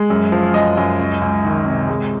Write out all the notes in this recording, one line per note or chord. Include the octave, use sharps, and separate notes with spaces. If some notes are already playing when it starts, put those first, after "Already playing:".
Already playing: G#3
F#2
F3
F#2 D#5
F#2
C#2
C#2
D#3
C3
G#3